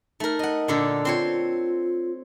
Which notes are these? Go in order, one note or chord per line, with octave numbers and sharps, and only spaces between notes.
A3 D#4 A#4
D#5 F#5
A#2 D3 A4
C4 F4 C5 C#5